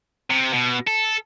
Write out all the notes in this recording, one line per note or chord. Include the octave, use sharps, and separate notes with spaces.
C3
B2
A4